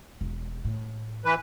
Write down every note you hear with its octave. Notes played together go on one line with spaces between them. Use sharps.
E1
A2
E3 B4